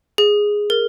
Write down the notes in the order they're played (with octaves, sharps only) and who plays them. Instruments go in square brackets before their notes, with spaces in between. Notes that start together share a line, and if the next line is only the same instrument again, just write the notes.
[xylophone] G#4
A#4